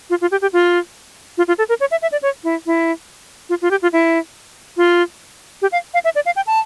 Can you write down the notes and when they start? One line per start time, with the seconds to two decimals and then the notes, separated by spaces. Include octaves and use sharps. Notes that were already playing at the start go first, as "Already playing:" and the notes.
0.10 F4
0.21 F4
0.31 G4
0.42 G4
0.53 F4
1.38 F4
1.48 F4
1.58 A4
1.69 A#4
1.80 C#5
1.91 E5
2.02 E5
2.12 D5
2.22 C#5
2.44 E4
2.66 E4
3.49 F4
3.62 F4
3.71 G4
3.82 F4
3.93 E4
4.77 F4
5.62 G4
5.72 F5
5.94 F5
6.04 E5
6.15 D5
6.26 F5
6.36 G5
6.47 A5